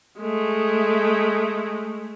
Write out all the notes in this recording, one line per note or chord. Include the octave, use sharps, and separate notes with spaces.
G#3 A3